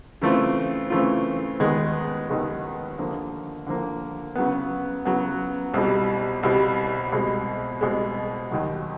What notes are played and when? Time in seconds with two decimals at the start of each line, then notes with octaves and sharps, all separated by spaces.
0.22 C#3 E3 A3 C4 F4
0.90 C#3 E3 A3 C4 F4
1.60 D#2 D#3 G#3 B3
2.29 D#2 D#3 G#3 B3
2.98 D3 F3 A#3
3.67 D3 F3 A#3
4.35 C#3 F#3 B3
5.05 C#3 F#3 B3
5.74 C2 B2 G3
6.43 C2 B2 G3
7.12 C2 B2 G#3
7.81 C2 B2 G#3
8.51 D#2 D#3 F#3